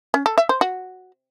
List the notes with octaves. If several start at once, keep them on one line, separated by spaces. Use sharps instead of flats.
C#4
A4
E5
C5
F#4